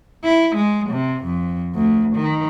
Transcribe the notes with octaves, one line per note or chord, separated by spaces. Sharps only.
E4
G#3
C3
F2
D2
D#3